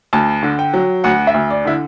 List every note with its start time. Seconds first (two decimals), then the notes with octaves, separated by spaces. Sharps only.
0.13 D2 A5
0.43 D3
0.59 G5
0.74 F#3
1.04 D2 F#5
1.27 E5
1.34 D2
1.50 D5
1.65 D3 E4